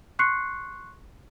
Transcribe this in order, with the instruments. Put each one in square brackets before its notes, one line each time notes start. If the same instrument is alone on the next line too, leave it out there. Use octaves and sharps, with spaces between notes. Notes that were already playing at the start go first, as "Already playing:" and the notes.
[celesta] C6 C#6 F#6 C7 C#7